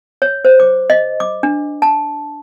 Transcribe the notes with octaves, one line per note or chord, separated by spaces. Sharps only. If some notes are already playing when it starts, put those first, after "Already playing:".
C#5
C5
D6
D#5
D6
D4
A5